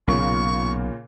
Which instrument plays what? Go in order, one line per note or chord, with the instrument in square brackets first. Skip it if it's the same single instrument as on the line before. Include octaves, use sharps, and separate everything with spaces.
[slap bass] B1 [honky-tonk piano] A#2 C#3 A#3 [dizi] C#6